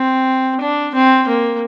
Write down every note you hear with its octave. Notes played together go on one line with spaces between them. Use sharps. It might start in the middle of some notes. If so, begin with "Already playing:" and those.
Already playing: C4
D4
C4
A#3